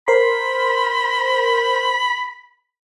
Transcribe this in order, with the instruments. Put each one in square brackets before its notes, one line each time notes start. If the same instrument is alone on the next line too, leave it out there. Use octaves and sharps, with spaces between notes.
[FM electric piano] A#4 C5 C6 [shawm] B5